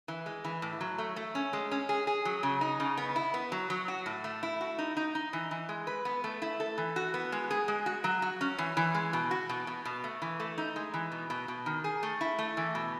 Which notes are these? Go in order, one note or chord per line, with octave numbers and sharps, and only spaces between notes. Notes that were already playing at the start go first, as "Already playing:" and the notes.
E3
G#3
E3
A2
F#3
A3
A3
C#4
G#3
C#4
G#4
G#4
F#3
C#3
D#4
C#3
B3
E4
B3
F#3
F#3
F#4
A2
A3
E4
F#4
D#4
D#4
D#4
E3
E3
G#3
B4
B3
A3
E4
A4
E3
F#4
B3
G#3
G#4
G#3
F#4
F#3
F#4
C#4
E3
E3
G#3
B2
F#4
B2
B2
B2
A3
E3
A3
D#4
G#3
E3
B2
B2
B2
D#3
G#4
A3
E4
A3
E3
B2